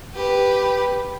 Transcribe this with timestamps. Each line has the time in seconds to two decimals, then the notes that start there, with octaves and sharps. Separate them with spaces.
0.15 G4 B4